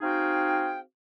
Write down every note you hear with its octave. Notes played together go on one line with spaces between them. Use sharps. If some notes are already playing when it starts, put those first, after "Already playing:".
C4 D#4 F#4 G#4 F5 G5